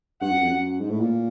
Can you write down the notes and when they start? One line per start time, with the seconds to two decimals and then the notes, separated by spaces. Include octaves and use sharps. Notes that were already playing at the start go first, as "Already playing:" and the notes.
0.21 G2 F#5
0.32 F#2
0.41 F2
0.50 F#2
0.80 G#2
0.90 A2
1.00 A#2